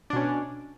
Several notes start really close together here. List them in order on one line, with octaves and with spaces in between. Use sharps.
D4 B2 C#4